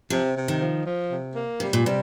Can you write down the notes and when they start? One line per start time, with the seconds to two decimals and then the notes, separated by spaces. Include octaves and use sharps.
0.10 C3 F3
0.36 C3
0.48 D#3
0.61 F3
0.85 F3
1.11 C3
1.35 A#3
1.60 C3 G3
1.73 A#2
1.85 C3 G3